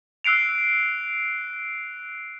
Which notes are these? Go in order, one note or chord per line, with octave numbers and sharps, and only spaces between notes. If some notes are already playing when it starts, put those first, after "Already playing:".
E6 F#6 C7 D7 F7